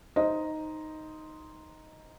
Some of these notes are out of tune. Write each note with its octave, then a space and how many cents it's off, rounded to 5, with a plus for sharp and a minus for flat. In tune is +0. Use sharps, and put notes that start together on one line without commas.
D#4 +0 C5 +0 D#5 +5